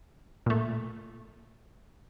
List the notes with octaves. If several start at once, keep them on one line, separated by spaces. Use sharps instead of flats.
A#2 A3